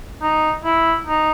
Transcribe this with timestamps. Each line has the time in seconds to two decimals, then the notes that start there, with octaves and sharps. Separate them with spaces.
0.22 D#4
0.65 E4
1.07 D#4